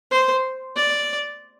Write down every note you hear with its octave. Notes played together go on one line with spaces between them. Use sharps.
C5
D5